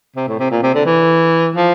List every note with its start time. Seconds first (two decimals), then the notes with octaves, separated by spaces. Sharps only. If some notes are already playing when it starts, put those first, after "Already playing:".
0.16 C3
0.28 A2
0.39 C3
0.51 A#2
0.63 C3
0.74 D3
0.86 E3
1.56 F3